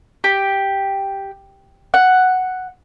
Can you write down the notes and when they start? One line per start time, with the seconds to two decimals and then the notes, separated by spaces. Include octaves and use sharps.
0.24 G4
1.94 F#5